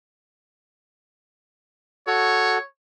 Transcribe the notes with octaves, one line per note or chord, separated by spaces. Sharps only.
F#4 A4 C#5